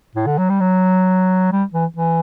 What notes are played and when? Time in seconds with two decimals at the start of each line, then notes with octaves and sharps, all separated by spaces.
0.15 A2
0.26 D3
0.38 F#3
0.50 G3
0.60 F#3
1.52 G3
1.74 E3
1.97 E3